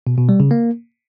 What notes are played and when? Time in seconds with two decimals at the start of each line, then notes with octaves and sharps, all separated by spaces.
0.07 B2
0.18 B2
0.29 G3
0.40 C#3
0.51 A#3